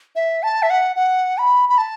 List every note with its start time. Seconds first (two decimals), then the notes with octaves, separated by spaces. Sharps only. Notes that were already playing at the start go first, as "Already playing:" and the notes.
0.16 E5
0.43 A5
0.63 E5
0.70 F#5
0.96 F#5
1.38 B5
1.69 B5
1.78 A5